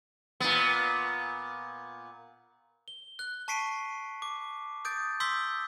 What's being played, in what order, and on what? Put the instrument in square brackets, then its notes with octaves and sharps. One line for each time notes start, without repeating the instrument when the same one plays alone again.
[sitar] A#2 B3
[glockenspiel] G7
F#6
A5 C#6 B6 C7 D7 D#7
D6
D#6 G6 A6 D7
C6 D#6 E6 G6 B6 G7